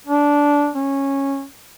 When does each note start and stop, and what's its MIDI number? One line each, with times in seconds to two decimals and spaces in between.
0.07 0.70 62
0.76 1.44 61